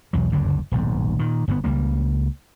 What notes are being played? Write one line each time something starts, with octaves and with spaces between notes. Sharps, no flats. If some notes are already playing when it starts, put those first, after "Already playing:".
B1 E2 F#3
F#1 D2 G2 D3
D#1 B1 G#2
A#2 D#3
G1 G#2 C3 B3
C#2 G3 A#3